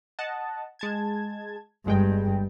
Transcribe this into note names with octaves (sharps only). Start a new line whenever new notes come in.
D#5 F#5 A5
G#3 A5 G#6
G1 G2 G#3 G5